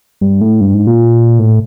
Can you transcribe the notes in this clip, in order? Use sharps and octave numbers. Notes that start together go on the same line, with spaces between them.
G2
A2
G2
G#2
A#2
A2